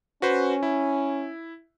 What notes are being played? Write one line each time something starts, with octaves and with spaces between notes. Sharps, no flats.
C#4 F#4 B4 C5
E4